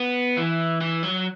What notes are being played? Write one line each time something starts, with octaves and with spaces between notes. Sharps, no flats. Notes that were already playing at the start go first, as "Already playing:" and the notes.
Already playing: B3
E3
E3
F#3